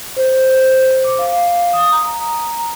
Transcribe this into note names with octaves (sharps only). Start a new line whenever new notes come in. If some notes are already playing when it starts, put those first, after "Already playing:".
C5
D6
F5
D#6
A#5